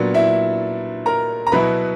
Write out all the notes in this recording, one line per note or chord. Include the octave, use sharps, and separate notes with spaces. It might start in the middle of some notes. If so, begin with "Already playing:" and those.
Already playing: A#2 F#3 B3 D4
E4 E5
A#4 A#5
A#5
B2 F#3 B3 E4 B4 B5